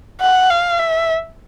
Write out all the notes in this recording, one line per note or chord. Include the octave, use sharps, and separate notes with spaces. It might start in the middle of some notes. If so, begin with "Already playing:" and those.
F#5
F5
E5